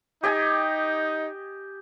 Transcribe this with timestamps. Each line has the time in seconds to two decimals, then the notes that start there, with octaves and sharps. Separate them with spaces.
0.23 D#4 G4 D#5 G#5